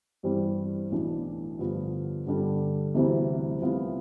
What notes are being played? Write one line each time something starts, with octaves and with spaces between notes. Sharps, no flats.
G2 E3 G3 C4 G4
B1 A2 E3 B3 D4
G2 D3 F3 B3
G2 D3 G3 D4 A4
D2 C3 E3 G3 C4
C2 C3 F3 B3 F4